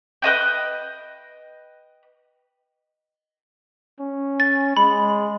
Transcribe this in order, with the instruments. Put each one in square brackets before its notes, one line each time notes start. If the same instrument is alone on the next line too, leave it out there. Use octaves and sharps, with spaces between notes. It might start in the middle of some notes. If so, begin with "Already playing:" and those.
[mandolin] B4 C5 D#5 G5
[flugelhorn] C#4
[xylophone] A6
[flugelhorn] G#3 [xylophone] B5